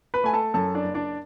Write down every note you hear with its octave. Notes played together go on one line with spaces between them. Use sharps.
B4 B5
A3 G#5
A4 A5
F#2 A4 A5
D4 D5
F#1
D4 D5